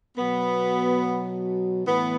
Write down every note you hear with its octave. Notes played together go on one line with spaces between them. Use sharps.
B2 F#3 B3
A2 E3 B3